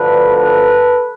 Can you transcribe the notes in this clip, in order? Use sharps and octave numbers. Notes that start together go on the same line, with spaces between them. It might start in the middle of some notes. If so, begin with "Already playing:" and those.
Already playing: D2 D3 F3 A4 B4
A4 B4